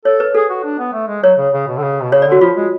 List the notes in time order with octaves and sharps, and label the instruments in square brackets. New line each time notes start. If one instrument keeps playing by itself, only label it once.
[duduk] A4 [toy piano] C#5
[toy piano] B4
[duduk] G#4 [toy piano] A4
[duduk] F#4
D4
B3
A3
G#3
[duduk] F#3 [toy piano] C#5
[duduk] C#3
C#3
B2
D3
C#3
B2
[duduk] C#3 [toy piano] C#5
[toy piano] D5
[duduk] D3
[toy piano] F#4
[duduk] F3 [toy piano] F4
[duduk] G#3